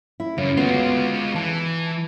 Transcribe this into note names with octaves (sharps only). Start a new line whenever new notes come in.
E4
F#2 C#3
D2 G#3 B3 F4
E3 A5